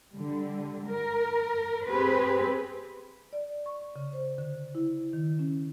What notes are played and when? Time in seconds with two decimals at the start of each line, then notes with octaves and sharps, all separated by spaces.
0.14 D3 G3
0.88 A#4
1.87 C4 G4 G#4 B4 C5
3.33 D5
3.66 C#6
3.96 C#3
4.13 C5
4.38 D3
4.75 E4
5.13 D#3
5.39 C#4